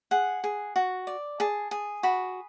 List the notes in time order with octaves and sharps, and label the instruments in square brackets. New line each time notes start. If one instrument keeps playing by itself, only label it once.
[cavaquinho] G#4 F#5
G#4
F#4
D5
G#4 A5
G#4
F#4 B5